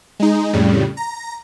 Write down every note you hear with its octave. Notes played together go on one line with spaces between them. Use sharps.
G#3 D#4
F2 A2 C#3 G3
A#5